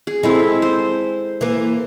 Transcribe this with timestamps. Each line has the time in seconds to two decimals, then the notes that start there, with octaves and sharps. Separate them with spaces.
0.07 G#4
0.23 G#3 C4 E4 A4
0.62 C5
1.41 E3 A#3